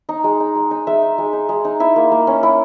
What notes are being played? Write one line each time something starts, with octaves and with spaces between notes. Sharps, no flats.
D#4
G#3
D#4
G#3
D#4
G#3 E5
D#4
G#3
D#4
G#3
D#4
E4 E5
A#3
A#3
C#4
E4